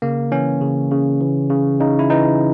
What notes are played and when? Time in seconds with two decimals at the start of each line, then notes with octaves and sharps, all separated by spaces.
0.02 C#3 A#3
0.31 E3 C#4
0.61 C#3
0.91 C#3
1.21 E3
1.50 C#3
1.80 C#3 D#4
1.99 E4
2.10 E3 D#4